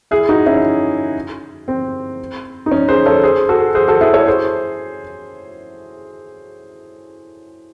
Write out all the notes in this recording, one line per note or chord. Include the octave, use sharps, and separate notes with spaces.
E4 G#4
D#4 F#4
C#4 E4
C4
D#4
C#4
G#4 C5
A4 C#5
G#4 C5
F#4 A4
G#4 C5
F#4 A4
E4 G#4
A4 C#5
G#4 C5